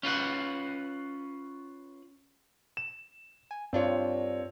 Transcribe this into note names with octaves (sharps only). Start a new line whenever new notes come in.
C#4 F4 B4 F#5
E7
G#5
G2 C4 D4 F4 C#5